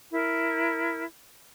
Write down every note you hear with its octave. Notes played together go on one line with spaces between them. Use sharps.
E4 A#4